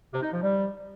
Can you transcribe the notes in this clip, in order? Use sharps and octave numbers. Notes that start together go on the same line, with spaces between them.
C3
D#4
F3
G3